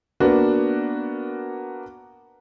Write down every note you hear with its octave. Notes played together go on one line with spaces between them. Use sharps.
A#3 B3 D4 F#4